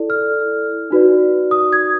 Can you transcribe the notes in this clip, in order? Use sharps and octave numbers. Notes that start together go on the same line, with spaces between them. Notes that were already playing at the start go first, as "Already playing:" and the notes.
Already playing: E4 A4 D5
F6
D#4 F#4 B4 D5
D#6
G#6